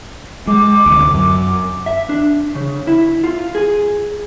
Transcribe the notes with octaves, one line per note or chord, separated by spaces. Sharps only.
G#3 D6
D2 C3
F#2
E5
D4
C#3
E4
F4
G#4